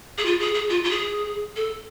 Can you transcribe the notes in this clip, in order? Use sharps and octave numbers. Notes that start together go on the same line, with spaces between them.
G#4
F4
G#4
G#4
F4
F4
G#4
A4